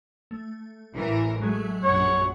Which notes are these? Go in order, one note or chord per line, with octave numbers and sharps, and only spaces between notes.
A3
A1 E3 A#4
F#3 G#3 A3 G#4
A#1 F#2 C#5 F#5